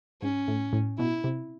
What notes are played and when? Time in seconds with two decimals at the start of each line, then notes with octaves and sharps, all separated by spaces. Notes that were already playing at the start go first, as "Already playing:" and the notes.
0.22 G#2 C#4
0.48 A2
0.73 A2
0.99 B2 E4
1.24 C3